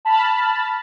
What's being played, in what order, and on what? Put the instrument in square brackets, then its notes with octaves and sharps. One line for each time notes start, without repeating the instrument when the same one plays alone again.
[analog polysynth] A5 B5 F6